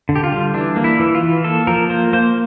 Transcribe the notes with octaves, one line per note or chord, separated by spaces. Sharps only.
D3
G4
F4
G3
E3 D4
A#3
E4
E3
F4
E3
A#3 A4
F3 A#4
A#3 C5
A#3 C5